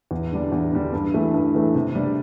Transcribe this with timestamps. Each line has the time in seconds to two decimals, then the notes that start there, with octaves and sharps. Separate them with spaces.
0.11 E2
0.32 D3 G3 D4
0.52 E2
0.72 D3 G3 D4
0.93 G2
1.14 E3 A3
1.34 G2
1.54 E3 A3
1.75 C3
1.95 G3 D4